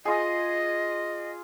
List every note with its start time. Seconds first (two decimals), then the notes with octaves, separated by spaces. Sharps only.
0.05 F4 G#4 D#5